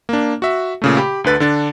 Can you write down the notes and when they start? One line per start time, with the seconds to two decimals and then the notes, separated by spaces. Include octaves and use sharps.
0.09 A#3 D4
0.42 F#4 E5
0.82 A#2 C#3 A3
0.97 G4 B5
1.24 D2 D3 B4 A6
1.40 D3 D4 A6